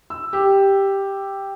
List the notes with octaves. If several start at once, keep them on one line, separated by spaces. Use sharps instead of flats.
E6
G4